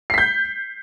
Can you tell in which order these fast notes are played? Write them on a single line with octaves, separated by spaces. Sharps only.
C7 B6 G6